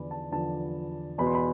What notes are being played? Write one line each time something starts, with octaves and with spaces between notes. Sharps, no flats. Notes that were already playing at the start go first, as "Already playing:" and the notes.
Already playing: E2 D3 F3 D5 B5
A5
E2 D3 F3 A5
E2 B2 B5
C6
B5